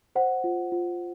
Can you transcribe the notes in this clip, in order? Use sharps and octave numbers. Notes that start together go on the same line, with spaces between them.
C5 F#5
F4
F4